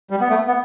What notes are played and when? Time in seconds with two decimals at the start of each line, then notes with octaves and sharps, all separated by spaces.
0.10 G3
0.20 B3
0.29 A3
0.47 B3